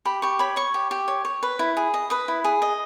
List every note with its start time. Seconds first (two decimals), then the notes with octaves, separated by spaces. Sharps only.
0.05 G4 B5
0.22 G4 C#6
0.39 C#5 B5
0.56 C#5 C#6
0.74 G4
0.91 G4
1.08 C#5
1.25 C#5
1.43 B4
1.59 E4
1.77 G#4
1.94 D#5
2.10 B4 D#6
2.28 E4
2.44 G#4
2.62 D#5